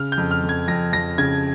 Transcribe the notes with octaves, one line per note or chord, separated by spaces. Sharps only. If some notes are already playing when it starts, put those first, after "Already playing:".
Already playing: C#3 F6
G6
F2
F6
F2
G#6
F2 A#6
F2 A#6
C#3 G#6